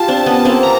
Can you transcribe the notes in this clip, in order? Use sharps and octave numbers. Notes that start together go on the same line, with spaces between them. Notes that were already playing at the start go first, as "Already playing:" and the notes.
Already playing: F4 G4 A5
C4 D4
B3 C#4
A#3 C4
A#5